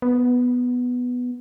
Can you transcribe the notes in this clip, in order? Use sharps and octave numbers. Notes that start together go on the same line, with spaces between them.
B3